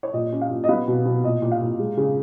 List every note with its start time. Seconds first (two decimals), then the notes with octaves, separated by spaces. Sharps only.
0.03 C#5
0.13 A#2 D#5
0.32 C#4
0.41 F5
0.50 A#2
0.64 D#5
0.69 B3 F5
0.88 B2
1.06 B2
1.24 A#2 D#5
1.42 A#2
1.51 F5
1.61 A#2
1.79 G#3
1.97 C#3